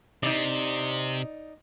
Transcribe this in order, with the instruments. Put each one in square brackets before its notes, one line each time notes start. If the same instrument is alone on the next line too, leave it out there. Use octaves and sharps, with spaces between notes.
[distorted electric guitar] C3 [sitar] D#4 D5